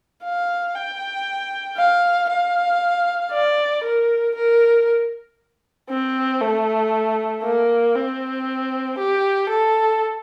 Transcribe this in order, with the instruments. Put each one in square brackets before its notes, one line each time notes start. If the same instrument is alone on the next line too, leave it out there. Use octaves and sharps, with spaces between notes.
[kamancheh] F5
G5
F5
F5
D5
A#4
A#4
C4
A3
A#3
C4
G4
A4